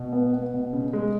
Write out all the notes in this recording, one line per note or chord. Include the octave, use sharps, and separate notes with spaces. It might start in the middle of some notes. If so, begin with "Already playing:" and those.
Already playing: B2
B3
B3
B2
C#3
G#3